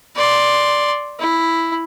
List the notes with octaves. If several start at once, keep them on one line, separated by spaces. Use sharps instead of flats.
D5 C6
E4